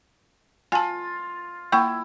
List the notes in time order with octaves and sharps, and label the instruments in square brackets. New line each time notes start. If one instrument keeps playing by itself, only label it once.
[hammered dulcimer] F4 [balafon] G#5 A5
[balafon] A#3 G5 C#6 [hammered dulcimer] E4